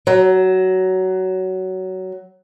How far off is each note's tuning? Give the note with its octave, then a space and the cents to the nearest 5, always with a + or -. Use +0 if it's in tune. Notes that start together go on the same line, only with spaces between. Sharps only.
F#3 +15